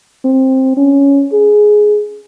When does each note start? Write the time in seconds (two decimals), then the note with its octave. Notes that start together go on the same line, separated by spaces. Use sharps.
0.25 C4
0.77 C#4
1.32 G#4